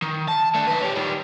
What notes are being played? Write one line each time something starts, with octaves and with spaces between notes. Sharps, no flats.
D#3
A5
A3 D4
D#4 B4
C#4 G4
D#3 G3